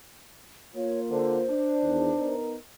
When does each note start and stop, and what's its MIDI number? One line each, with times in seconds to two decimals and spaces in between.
0.75 1.46 58
0.75 1.46 65
0.75 1.01 73
1.10 1.37 50
1.10 2.35 72
1.50 2.35 62
1.83 2.11 40
1.83 2.11 51
2.17 2.54 59
2.17 2.54 63
2.17 2.54 70